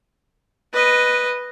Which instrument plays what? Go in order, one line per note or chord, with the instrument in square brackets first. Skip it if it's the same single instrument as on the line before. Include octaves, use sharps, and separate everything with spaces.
[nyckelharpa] B4 D#5